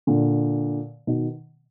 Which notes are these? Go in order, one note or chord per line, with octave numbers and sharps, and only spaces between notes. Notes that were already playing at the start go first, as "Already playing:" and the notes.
A#2 D3
B2 D#3